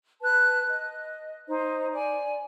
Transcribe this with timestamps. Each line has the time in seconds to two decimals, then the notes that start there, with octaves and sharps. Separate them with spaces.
0.22 B4 A5 F#6
0.69 D#5
1.48 D#4 C5
1.93 D5 G#5